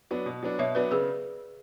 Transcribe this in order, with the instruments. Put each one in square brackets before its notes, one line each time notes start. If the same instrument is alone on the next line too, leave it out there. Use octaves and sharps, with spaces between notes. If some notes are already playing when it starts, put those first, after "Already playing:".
[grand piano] F#3 B3 D4
B2
F#3 B3 D4
[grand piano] B2 [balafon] C#5 E5
[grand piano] F#3 B3 D4 [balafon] B4 D5
[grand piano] C#3 [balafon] G#4 B4